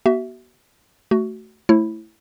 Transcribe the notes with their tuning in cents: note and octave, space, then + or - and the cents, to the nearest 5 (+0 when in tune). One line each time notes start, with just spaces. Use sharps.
B3 -40 F#4 +35 E5 +0
A3 +0 F#4 +15
A3 +0 E4 +0 C5 +45